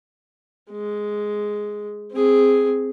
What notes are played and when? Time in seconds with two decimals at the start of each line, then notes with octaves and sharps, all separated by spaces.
0.71 G#3
2.12 C4 G#4